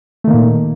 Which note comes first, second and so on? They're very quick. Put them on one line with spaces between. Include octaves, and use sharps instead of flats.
A3 D#3 A#3 A#2